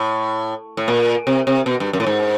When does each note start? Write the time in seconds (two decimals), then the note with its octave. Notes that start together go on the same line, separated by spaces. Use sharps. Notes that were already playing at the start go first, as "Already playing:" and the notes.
Already playing: A2
0.77 A2
0.88 A#2
1.27 C3
1.47 C3
1.66 B2
1.80 G2
1.93 F#2
2.00 A2
2.06 G#2